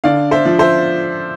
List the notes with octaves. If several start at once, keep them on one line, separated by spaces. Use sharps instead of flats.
D3 D5 F5
C5 E5
F3
C5 E5